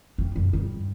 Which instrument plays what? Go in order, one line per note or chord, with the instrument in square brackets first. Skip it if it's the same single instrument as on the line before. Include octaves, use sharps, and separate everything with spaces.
[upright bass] F2
F#2
G2